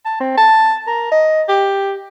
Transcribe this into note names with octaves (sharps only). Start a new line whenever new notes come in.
A5
C4
A5
A#4
D#5
G4